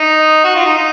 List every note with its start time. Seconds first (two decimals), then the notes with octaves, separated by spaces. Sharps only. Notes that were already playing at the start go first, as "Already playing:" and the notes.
Already playing: D#4
0.44 F#4
0.55 F4
0.66 D#4
0.77 D#4